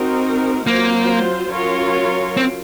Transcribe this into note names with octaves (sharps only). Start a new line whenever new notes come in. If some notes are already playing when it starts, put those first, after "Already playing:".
Already playing: C4 D#4 F#4 A#4
F#3 A#3 C4 F4 C5
F#3 C#4 F4 A#4 C#5
C4